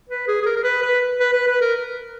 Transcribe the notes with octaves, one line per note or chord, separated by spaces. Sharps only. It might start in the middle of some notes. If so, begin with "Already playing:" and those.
B4
G#4
G#4
A#4
A#4
B4
B4
B4
B4
B4
A#4